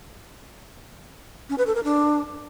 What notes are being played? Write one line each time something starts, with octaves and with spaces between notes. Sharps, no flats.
C#4
B4
A4
A#4
D4